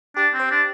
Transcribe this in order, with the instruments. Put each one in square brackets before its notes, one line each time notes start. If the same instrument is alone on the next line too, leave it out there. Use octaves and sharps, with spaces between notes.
[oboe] D4 [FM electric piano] G4
[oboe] C4
[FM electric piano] C5
[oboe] D4